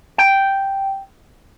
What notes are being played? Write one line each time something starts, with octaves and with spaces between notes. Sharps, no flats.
G5